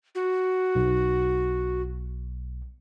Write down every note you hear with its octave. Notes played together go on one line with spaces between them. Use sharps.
F#4
B1